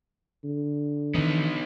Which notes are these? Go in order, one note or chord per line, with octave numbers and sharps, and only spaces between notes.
D3
D#3 E3 B3 D#4